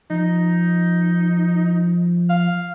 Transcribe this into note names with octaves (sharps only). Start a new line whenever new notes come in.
F3 D#4
F5